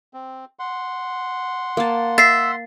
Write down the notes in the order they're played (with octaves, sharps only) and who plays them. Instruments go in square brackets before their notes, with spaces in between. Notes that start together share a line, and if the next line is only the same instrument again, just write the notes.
[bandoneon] C4
F#5 C6
[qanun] A#3 A5
[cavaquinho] E5 [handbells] A6 C7